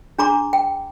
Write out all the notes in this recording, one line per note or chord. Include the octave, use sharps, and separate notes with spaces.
D4 G#4 A#5 C6 D6
G5